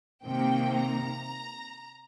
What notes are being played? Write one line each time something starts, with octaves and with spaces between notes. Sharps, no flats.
C3 D#3 A#3 G5
A#5